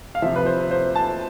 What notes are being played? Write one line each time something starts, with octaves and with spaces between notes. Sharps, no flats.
F5
C3 F3 E5
B4
C5
C5
A5